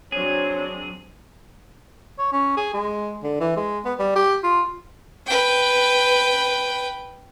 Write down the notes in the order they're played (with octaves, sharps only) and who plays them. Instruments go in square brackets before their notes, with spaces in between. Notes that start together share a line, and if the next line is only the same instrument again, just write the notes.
[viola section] F#3 C4 D4 [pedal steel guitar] G#4 [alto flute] C#5
[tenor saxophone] C#5
C#4
G#4
G#3
D3
E3
G#3
B3
G3
G4
F4
[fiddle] B4 G5